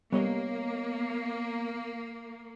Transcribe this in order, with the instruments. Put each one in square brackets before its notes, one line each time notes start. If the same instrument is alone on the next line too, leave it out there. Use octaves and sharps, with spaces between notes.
[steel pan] G3 [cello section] A#3 [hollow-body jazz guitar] B3 C#5 D#5